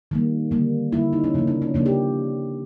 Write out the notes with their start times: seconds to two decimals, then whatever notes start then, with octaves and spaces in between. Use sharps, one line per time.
0.11 D#3 G3 A#3
0.51 D3 G3 A#3
0.92 D3 G3 A#3 E4
1.13 D#4
1.24 C#4
1.34 C#3 F3 A#3
1.48 D4
1.62 C#4
1.74 C#3 F3 A#3 D4
1.86 G4